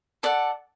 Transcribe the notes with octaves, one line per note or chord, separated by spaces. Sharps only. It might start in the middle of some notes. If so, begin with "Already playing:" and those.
A4 D5 F#5